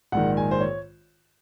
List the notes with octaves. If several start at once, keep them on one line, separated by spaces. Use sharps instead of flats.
A#1 G#2 D#3 F#5
G#5
C5
C#5